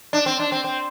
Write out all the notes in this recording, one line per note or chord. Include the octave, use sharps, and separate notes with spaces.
D4
C4
D4
C4
C4